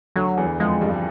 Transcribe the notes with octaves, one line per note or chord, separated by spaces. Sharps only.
D2 D3 F#3
E2 E3
F2 F3 G#3
G2 G3